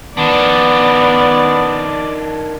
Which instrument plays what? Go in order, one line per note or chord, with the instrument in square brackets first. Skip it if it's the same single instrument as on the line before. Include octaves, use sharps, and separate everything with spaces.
[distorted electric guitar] D#3 D4 [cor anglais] B3 [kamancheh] D5